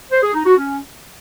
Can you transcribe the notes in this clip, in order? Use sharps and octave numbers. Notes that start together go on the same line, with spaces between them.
C5
G#4
D#4
F#4
C#4